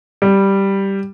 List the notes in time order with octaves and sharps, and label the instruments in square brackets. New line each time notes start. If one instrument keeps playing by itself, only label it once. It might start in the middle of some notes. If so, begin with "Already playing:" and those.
[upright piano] G3